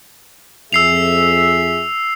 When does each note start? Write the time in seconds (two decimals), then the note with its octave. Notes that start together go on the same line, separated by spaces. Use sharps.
0.73 F2 G#4 E5 E6 C7 F7